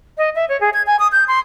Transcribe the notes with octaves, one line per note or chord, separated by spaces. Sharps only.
D#5
E5
C#5
G#4
G#6
G#5
D#6
G6
C6